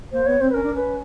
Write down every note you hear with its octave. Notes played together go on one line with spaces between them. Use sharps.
A#3 C5
B3 C#5
C4 C5
B4
C#4 A#4
D4
C#4 B4